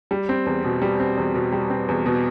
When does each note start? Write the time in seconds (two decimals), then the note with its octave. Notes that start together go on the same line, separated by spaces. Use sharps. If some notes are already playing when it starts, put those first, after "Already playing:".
0.11 G3
0.29 C4
0.46 E2
0.64 B2
0.82 G3
1.00 C4
1.17 E2
1.35 B2
1.52 G3
1.70 C4
1.88 E2
2.06 B2